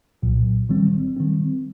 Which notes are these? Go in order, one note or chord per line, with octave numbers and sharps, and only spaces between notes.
C2 A#2 F#3
D#3 G3 C4
D#3 G3 C4